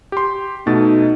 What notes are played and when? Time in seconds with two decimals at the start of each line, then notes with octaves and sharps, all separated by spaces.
0.12 G4 C6
0.67 B2 A3 D#4 A6